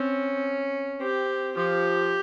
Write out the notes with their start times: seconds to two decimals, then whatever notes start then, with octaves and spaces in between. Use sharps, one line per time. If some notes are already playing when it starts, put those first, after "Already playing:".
Already playing: C4 C#4
1.00 C4 G4
1.57 F3 G4